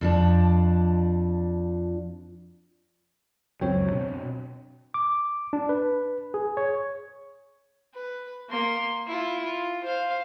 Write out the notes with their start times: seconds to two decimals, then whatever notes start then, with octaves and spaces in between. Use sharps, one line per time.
0.01 F2 F3 D4
3.61 C#2 F#2 F#3 C4 C#5 G5
3.91 B2 D4
4.94 D6
5.53 D4
5.69 B4
6.34 G#4
6.57 C#5
7.94 B4
8.50 A#3 C6
9.07 E4 F4
9.45 F4
9.84 C5 F5